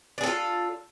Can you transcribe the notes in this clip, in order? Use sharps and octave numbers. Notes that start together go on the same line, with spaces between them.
D4 F4 G#4 A4